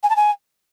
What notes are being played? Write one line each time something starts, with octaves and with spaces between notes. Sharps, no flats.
G#5
A5
G#5